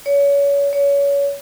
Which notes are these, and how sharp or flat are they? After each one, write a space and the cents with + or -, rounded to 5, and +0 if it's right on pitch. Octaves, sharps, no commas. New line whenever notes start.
C#5 +30
C#5 +25